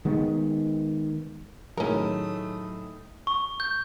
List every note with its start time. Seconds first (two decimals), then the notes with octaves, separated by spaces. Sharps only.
0.05 D#3 G#3 B3
1.77 A2 D#3 F#3 A3 C#4 G#4 A#4 D#6
3.27 C#6
3.60 G6